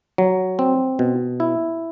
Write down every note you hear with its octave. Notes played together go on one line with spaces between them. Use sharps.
F#3
C4
B2
E4